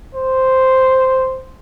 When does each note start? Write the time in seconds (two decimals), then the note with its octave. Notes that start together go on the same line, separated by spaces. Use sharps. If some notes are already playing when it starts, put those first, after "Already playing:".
0.15 C5